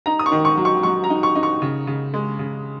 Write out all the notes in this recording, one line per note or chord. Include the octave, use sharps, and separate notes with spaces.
D#4 A#5
D#6
C#6
D#3
C#6
F#3
C#6
F#3 C#6
A#5
D#4
C#6
D#4
C#6
C#3
C#3
G#3
C#3